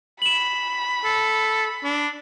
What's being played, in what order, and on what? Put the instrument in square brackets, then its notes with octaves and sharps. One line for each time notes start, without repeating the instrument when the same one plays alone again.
[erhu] B5 [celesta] E7 F#7
[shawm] A4
D4